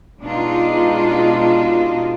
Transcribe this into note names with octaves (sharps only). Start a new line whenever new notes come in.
B2 G#3 D4 D#4 F4